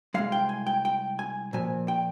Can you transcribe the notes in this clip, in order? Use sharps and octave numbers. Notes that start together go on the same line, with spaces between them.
C2 A#2 G#3 F5
G5
G#5
G5
G5
G#5
A#2 F3 G#5
G5